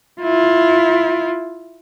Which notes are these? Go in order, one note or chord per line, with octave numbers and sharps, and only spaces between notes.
E4 F4